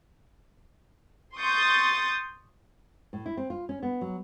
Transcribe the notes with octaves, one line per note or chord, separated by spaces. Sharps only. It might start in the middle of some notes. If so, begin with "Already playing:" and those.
C6 C#6 D#6 G6 A6
A2
E4
C4
F4
C#4
B3
F#3